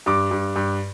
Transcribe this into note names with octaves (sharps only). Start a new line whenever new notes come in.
G2 D6
G2
G2